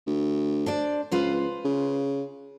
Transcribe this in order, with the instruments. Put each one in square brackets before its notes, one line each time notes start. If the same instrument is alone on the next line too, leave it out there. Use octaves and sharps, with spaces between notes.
[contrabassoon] D2
[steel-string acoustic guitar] D4 C5 D5
[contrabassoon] C#2 [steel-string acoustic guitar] F4 B4 C5
[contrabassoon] C#3